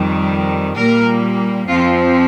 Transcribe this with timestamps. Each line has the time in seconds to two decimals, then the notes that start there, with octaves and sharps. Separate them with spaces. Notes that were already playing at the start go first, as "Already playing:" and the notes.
Already playing: F2 D#3 G3
0.77 A#2 G3 A#3 A#4
1.68 F2 F3 C4 F4